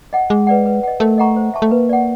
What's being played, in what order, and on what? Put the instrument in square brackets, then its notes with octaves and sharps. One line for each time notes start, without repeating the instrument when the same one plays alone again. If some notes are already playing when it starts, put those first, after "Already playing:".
[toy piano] D#5 F#5
[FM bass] G#3 [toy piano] G#4
[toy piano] B4 D5 F#5
B4
D#5 F#5
[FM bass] A3 [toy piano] A#4
[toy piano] D#5 F#5 A#5 C#6
C5
E5 A5 C#6
[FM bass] A3
[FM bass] A#3 [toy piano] B4
[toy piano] D5 F#5